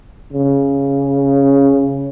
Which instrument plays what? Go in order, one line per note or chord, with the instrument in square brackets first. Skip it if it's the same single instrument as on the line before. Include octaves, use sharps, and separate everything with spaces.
[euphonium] C#3